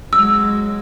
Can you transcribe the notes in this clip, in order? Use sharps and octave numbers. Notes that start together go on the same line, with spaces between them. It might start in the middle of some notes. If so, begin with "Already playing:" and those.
F#3 G#3 E6